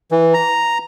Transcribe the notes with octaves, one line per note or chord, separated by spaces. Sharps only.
E3
A#5